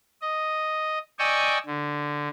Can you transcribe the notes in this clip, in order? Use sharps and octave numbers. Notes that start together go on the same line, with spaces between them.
D#5
D5 D#5 G5 G#5 C#6 E6
D3